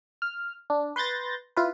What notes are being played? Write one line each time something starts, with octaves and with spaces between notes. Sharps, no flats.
F6
D4
B4 C6 G6 A6 A#6
E4 F4 B4